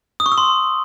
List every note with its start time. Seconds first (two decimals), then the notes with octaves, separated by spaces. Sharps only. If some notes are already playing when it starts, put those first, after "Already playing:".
0.20 D#6
0.26 C#6
0.32 E6
0.38 C6